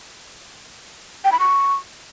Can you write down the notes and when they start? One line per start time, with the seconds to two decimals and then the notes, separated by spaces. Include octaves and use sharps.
1.24 G5
1.32 B5
1.39 C#6